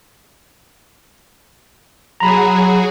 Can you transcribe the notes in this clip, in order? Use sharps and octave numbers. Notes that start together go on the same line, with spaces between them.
F#3 F#4 G#4 A#5 B5